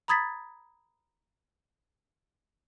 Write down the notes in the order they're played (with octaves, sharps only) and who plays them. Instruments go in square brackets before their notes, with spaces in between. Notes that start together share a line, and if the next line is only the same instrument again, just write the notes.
[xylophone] A#5 B5 D#6 G#6 A6 B6